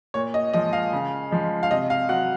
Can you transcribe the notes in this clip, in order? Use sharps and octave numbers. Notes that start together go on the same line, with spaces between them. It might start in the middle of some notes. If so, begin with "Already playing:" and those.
A#2 C#5
D#5
F3 G#3 D#5
F5
C#3
F3 G#3
F5
C3 D#5
F5
F#3 F#5